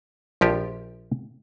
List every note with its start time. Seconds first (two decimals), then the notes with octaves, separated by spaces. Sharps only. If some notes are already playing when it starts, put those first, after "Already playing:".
0.41 A#1 F3 G4